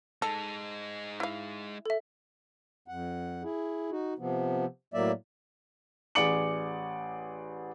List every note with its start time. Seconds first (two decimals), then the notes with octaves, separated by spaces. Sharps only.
0.22 G#3 D#4 A4
1.20 E4 F5
1.86 A4 E5
2.88 F2 F#5
3.43 E4 G#4
3.91 D#4 F#4
4.19 C3 F3 B3
4.94 A2 F#3 A#3 D5 E5
6.15 A1 G#4 D5 D6 C#7 F#7